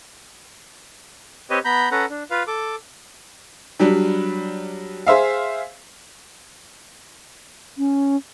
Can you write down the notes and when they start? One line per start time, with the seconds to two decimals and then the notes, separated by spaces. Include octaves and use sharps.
1.50 C4 G4 B4 C#5 D#5
1.65 B3 A#5 B5 G6
1.91 C#4 A4 B4 F#5 A#5
2.10 D4
2.31 F4 B4 F5
2.47 A4 D6
3.79 F#3 G3 D4
5.07 G#4 C5 E5 F5
7.78 C#4